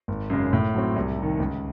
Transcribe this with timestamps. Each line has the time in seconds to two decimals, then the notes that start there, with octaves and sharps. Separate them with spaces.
0.08 G#1
0.30 F#2 C#3 G#3
0.53 A2
0.74 F#3 C4
0.96 C2
1.18 C3 D#3
1.40 C#2